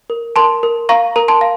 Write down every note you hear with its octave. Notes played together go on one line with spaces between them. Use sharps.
A#4
A#4 A5 C6
A#4
F5 A#5 C#6
A#4 A#5
A5 C6
F5